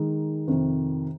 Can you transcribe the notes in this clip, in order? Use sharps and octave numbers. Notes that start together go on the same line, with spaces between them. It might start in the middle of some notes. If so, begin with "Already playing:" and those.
Already playing: D#3 G#3 D#4
F2 C3 D#3